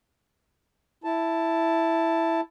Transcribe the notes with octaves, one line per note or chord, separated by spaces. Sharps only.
E4 A5